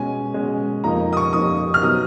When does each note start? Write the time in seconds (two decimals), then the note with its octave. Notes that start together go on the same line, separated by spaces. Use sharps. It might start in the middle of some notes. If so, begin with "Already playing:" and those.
Already playing: B2 G#3 C#4 G#5
0.34 B2 G#3 C#4
0.84 F2 F3 A#3 D#4 A#5
1.13 D#6
1.17 C#6
1.33 F2 F3 A#3 D#4 D#6
1.74 F6
1.83 B2 F#3 B3 D#4 D#6